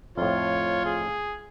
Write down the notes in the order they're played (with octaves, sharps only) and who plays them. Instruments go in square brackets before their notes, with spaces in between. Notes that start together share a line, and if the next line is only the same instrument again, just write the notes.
[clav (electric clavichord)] F2 A2 [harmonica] F4 [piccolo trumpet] C#5
[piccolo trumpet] G#4